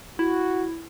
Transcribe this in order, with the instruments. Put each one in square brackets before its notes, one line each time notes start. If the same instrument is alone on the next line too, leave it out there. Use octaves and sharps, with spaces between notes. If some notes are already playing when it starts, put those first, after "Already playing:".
[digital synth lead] E4 [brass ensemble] F#4